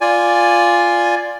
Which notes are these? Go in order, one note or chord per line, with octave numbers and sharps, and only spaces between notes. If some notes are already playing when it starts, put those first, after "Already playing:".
F4 D5 G#5